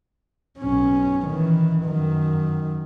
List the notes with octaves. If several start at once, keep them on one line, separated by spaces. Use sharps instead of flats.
B1 C#4
D#3 E3
F#2 D#3